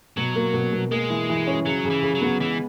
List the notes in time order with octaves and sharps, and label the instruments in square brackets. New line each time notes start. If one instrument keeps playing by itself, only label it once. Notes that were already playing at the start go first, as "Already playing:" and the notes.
[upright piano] B2 [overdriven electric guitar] F#3
[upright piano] A#3
B2
B2
[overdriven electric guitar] G#3 [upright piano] A#3
[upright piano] E3
E3
C#4
[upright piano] C#3 [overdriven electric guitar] F#3
[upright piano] C#3
[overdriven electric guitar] E3
[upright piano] C#3
[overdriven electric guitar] F#3
[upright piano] B3
[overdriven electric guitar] E3 [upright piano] G#3